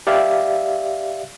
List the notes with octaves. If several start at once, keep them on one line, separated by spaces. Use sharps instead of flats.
G4 D5 E5 F5